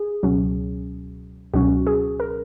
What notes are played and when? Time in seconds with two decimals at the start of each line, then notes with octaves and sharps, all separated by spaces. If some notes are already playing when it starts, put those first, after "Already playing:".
Already playing: G#4
0.23 C#2 B2 F#3 C#4
1.54 C#2 B2 F#3 C#4 F#4
1.87 G#4
2.20 A#4